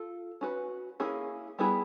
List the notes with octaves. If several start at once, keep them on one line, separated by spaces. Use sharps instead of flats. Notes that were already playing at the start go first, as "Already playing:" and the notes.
Already playing: F4 A4
C#4 F#4 B4
A#3 C#4 E4 G#4
G3 B3 E4 G#4